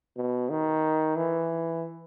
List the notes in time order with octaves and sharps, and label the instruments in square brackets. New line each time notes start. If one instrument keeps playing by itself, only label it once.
[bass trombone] B2
D#3
E3